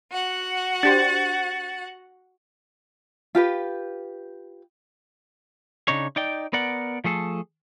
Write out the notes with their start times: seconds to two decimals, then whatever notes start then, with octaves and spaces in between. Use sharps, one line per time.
0.11 F#4 F#5
0.83 D4 G4 C5 A6
3.35 F4 G4 B4
5.88 C#3 D4 D#4 C#5
6.16 D#4 D5 G5
6.53 B3 A#4 D5 F#5
7.04 F3 A3 G#4 A4